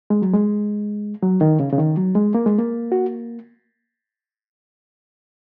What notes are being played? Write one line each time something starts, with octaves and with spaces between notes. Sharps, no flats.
G#3
F#3
G#3
F#3
D#3
C#3
C#3
D#3
F#3
G#3
A#3
G#3
A#3
F#4